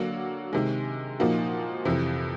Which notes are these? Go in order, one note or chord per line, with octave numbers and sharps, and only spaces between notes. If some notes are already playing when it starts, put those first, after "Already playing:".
Already playing: D3 F#3 A#3 D4 F#4
C3 D#3 G#3
A#2 F3 A#3 D#4 F#4
F2 C3 E3